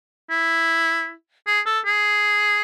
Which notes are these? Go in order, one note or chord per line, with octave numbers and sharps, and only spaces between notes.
E4
G#4
A4
G#4